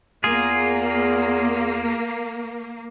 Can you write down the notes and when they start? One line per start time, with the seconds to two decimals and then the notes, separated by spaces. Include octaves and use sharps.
0.24 E2 A#3 F4 G#4